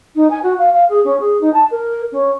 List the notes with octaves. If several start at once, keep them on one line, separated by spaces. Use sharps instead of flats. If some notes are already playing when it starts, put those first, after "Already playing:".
D#4
G#5
F#4
F5
F5
G#4
C#4
G#4
D#4
A5
A#4
C#4